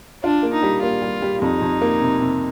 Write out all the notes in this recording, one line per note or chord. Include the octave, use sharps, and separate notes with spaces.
D4 F4
A#3
D#4
G3
A#3 F4
G3
G3
F2 D#4
F2
A#3
C3
C3